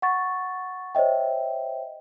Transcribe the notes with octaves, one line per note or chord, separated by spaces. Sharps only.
F#5 C#6 A6
C5 C#5 D#5 E5 G5